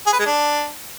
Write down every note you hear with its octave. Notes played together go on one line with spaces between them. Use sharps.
G#4
B4
G#3
D4